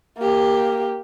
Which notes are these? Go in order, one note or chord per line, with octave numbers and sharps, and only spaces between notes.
A#3 G4